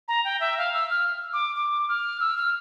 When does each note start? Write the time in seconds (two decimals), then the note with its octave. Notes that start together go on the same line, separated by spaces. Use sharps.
0.08 A#5
0.25 G5
0.40 E5
0.58 F5
0.74 E6
0.90 F6
1.33 D6
1.56 D6
1.89 F6
2.20 E6
2.37 F6